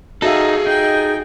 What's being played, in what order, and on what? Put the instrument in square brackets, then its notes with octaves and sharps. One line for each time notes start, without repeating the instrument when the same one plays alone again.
[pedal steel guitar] D#4 [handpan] F#4 E5 F5 [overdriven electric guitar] G#4 A4
[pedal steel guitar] D#4 [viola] G5 G#5